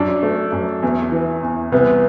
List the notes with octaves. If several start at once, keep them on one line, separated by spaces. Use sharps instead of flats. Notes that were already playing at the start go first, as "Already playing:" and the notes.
Already playing: F#2 D4
A3
F#2
E2
E3
E2
C2 B3